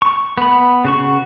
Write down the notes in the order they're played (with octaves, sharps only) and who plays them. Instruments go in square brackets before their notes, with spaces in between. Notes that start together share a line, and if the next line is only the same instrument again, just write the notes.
[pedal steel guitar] C#6
B3 B5
C#3 F#4 C#6